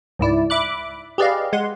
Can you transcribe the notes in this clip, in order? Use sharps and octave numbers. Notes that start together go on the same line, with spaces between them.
C#2 G#2 E4 D5
E5 B5 D6 F#6
G4 G#4 B4 D5 D#5 F5
G#3 F#5 C6